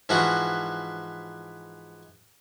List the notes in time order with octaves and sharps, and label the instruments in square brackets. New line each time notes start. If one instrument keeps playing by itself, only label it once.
[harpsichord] G#2 E3 F3 F#4